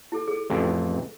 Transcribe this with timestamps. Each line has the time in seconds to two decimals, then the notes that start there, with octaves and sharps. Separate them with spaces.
0.12 E4 G4 A4
0.28 G#4 A4
0.50 A1 F2